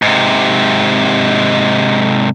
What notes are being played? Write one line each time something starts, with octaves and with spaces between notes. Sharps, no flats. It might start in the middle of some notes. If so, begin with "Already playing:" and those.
G#2 C3